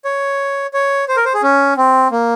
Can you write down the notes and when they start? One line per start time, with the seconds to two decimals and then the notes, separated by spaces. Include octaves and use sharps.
0.05 C#5
0.74 C#5
1.08 C5
1.17 A#4
1.25 C5
1.34 G#4
1.43 C#4
1.77 C4
2.11 A#3